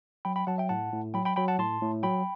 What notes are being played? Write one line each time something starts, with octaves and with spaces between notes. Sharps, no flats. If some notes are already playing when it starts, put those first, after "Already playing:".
F#3 G5 B5
G5 B5
F#3 F#5 A5
E5 G5
A2 F#5 A5
A2
F#3 G5 B5
G5 B5
F#3 G5 B5
F#5 A5
A2 A5 C6
A2
F#3 G5 B5